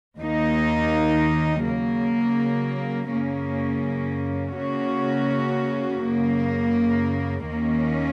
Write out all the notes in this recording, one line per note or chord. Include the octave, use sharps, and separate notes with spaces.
D#2 D#3 A#3 D#4
C#3 F#3 A#3
F#2 C#3 A#3 C#4
C#3 A#3 C#4 F#4
F#2 C#3 A#3
D#2 D#3 A#3 C#4